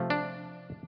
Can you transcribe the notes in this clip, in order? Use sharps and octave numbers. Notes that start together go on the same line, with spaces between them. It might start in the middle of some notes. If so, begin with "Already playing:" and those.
Already playing: C3 F3 A3
D4